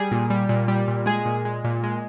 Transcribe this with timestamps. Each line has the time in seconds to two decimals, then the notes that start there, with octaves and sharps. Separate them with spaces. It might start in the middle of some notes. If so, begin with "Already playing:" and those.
Already playing: G3 G#4
0.11 A#2
0.30 G3
0.49 A#2
0.68 G3
0.88 A#2
1.06 G#3 G#4
1.25 A#2
1.45 G#3
1.64 A#2
1.83 G#3